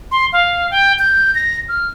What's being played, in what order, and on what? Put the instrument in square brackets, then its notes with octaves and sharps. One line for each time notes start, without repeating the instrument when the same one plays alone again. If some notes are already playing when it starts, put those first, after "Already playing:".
[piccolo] C6
F5
G5
G6
A#6
F6